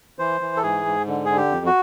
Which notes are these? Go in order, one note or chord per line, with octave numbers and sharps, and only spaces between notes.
E3 C5
E3
A4
G#2 G#4
G#2
D3
D3 G#4
G4
F2
F#4